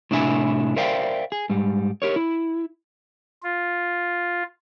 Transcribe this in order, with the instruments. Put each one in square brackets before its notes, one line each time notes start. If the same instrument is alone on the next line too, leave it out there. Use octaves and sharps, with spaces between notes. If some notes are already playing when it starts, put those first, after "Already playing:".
[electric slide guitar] A2 C3 D4 E4 E5 G#5
A#4 C5 D5 E5 F5 G5
G#4
G#2 G3
G4 A#4 C#5
E4
[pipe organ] F4